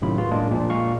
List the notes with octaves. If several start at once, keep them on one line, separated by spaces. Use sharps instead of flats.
F#2 A2 C3 D#3 F4 B5
F4 F#4 G#4 B4
F#2 A2 G#3 A#3 D4
A#2 F3 D4
A#2 G#3 F5 C#6